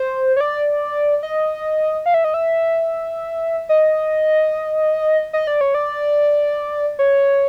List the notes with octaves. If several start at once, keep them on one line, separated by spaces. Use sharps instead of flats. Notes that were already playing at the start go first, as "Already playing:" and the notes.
Already playing: C5
C#5
D5
D#5
F5
E5
D#5
E5
D#5
D#5
D5
C#5
D5
C#5